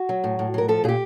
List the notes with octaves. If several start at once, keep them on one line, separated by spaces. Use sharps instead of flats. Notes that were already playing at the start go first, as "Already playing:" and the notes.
Already playing: F#4
F#3
A2
A2
F#3 A#4
F3 A4
A#2 G4 G#4